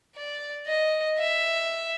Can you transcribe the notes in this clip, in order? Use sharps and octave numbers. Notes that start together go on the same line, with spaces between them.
D5
D#5
E5